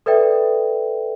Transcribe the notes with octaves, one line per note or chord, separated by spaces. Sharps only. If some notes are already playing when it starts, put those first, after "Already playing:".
A4 B4 D5 E5 G5